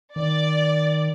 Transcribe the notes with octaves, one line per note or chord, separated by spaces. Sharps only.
D#3 D5